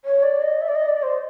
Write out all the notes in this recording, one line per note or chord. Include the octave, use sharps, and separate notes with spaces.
C#5
D5
D#5
E5
D5
D#5
D5
C5